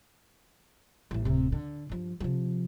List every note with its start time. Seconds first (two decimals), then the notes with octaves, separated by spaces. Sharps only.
1.11 A1 A2
1.25 D1 C3
1.52 D3
1.89 G2 F3
2.20 C3 F3